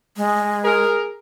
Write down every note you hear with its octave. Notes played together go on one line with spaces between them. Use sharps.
G#3
G#4 A#4